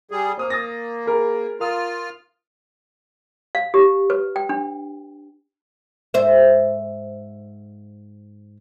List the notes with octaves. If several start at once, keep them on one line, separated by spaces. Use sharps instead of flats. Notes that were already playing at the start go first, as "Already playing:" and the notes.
G3 G#4
A#3 C5 D#6 F6
D#6 A6 A#6
G#4 A#4 B5
F4 A#4 F5 D#6 F6
F5
G4
B4
G5
D4
G#2 C5 E5